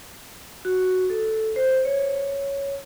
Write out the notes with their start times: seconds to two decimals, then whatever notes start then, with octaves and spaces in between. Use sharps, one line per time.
0.65 F#4
1.10 A4
1.56 C5
1.85 C#5